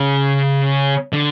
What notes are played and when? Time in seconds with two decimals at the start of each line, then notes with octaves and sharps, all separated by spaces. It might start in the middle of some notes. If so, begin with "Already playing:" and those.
Already playing: C#3
1.13 D3